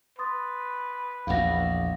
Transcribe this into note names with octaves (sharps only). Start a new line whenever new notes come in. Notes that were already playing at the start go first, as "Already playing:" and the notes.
B4 C6 D#6 A6
A#1 E2 F5 F#5 A#6